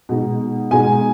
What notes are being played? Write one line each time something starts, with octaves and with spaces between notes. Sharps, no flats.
B2 G#3 D#4
B2 G#3 D#4 G#5